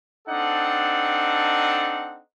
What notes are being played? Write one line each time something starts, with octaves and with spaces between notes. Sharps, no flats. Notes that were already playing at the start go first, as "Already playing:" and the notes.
C4 D4 D#4 A4 F#5